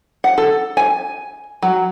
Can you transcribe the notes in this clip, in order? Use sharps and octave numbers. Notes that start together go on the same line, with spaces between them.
F#5
A4
G#5
F#3